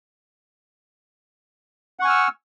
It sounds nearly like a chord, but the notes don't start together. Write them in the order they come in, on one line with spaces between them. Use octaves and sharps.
F#5 C#6 G#5 F6 E6